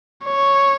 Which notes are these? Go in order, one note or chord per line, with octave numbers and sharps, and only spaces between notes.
C#5